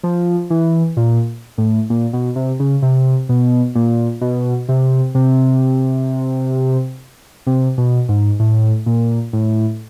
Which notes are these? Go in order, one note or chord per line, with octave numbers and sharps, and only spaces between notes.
F3
E3
A#2
A2
A#2
B2
C3
C#3
C3
B2
A#2
B2
C3
C3
C3
B2
G#2
A2
A#2
A2